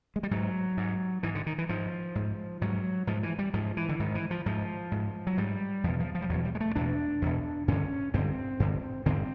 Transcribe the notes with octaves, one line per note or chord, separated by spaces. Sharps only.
G#3
G3
G#2 F#3
G#2
G#2 E3
D3
D#3
E3
G#2 F3
G#2
G#2 F#3
G#2 F3
E3
G3
G#2 F3
E3
D3
G#2 D#3
E3
F3
G#2 F3
G#2
F#3
G#2 G3
E2 B2 F3
F3
F3
G3
E2 B2 F#3
G3
G#3
A3
E2 B2 D4
E2 B2
G2 D3 C#4
G2 D3 C4
G2 D3
G2 D3 C4